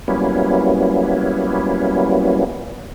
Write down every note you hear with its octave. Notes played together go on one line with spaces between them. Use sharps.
F#3 G3 A#3 B3 C#4 E4